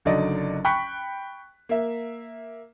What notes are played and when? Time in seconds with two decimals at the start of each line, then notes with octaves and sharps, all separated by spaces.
0.05 F#1 D3 F#3 D#4 D5 D#5
0.65 G5 B5 C#6 F#6 B6
1.69 A#3 E5